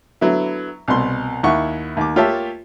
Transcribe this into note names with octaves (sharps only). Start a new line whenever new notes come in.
D3 F#3 B3 E4
C2 B2 C6
D#2 E4 F#5 C#6
D#2 D6
A#3 F4 G4 C#5 E5 A5